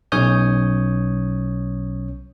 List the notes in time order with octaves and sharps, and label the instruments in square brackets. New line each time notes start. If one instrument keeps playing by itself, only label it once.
[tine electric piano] B1 C#4 C#5 D#6 G6